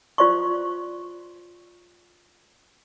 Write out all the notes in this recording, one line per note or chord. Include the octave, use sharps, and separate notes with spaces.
F4 C5 D5 C6 C#6